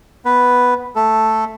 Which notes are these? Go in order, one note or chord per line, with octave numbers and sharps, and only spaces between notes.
B3 B4
A3 A4